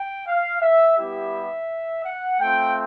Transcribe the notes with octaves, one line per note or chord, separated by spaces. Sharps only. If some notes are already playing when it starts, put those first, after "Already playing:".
Already playing: G5
F5
E5
G3 B3 E4 G4 E5
F#5
A3 C4 F4 G5